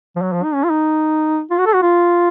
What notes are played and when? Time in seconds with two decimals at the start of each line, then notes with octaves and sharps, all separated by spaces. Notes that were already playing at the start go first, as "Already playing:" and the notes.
0.16 F3
0.22 F#3
0.33 F3
0.43 D#4
0.54 C#4
0.64 F4
0.70 D#4
1.51 F4
1.58 F#4
1.66 A4
1.74 F#4
1.82 F4